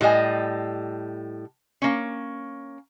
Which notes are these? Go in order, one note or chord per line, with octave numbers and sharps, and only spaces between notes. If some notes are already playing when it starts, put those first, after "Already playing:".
A2 G3 D#5 G#5
A#3 C#4